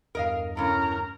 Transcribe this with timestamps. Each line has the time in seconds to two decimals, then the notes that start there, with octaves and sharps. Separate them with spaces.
0.15 E2 G2 A#4 D#5 F5
0.57 A2 C#3 C#4 A#4